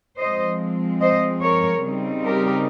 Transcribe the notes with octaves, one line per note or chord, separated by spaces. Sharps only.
F3 G#3 C4 C5 D#5
C5 D#5
A#4 C#5
C#3 G3 C4 D#4
G4 A#4